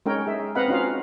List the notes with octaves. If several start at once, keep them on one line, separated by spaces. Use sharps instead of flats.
G#3 C#4 D#4 A#4 C#5 G5
G#4 E5
C4 B4 D#5 F5 F#5 B5
C#4 D#4 F4 F#4 F5